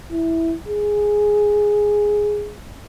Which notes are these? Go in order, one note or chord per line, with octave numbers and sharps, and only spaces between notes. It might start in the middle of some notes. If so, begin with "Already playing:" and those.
E4
G#4